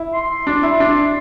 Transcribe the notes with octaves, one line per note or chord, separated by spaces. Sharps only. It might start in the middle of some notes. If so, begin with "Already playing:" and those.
Already playing: E4
C6
D4
E4
D4